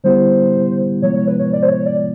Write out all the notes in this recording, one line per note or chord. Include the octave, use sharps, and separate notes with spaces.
D3 G3 B3 E4 G4 C5
C3 F3 G#3 B3 E4 C#5
C#5
B4
C#5
D5
C5
C#5
D5